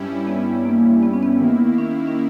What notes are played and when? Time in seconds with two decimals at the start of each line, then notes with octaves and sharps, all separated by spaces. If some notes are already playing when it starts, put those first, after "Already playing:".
Already playing: G2 G3 C#4 E4
0.27 B3
0.65 A#3
1.03 B3
1.13 C#4
1.23 B3
1.40 D#3 A#3 E4
1.78 C#4
2.07 C#4